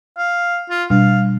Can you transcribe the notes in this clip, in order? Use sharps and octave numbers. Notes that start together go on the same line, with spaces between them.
F5
F4
B2 G3 D4 F5